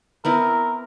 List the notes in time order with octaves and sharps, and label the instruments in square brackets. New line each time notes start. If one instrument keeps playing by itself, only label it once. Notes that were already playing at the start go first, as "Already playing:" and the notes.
[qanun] B3 C4 E4 [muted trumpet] A#4